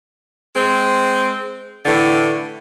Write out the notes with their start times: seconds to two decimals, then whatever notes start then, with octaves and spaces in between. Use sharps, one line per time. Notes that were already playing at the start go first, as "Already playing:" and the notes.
0.55 G#3 C4
1.86 A2 D3 E3